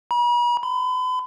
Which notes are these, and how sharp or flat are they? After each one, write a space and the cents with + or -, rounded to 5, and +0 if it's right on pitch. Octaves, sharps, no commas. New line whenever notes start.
B5 -45
B5 +40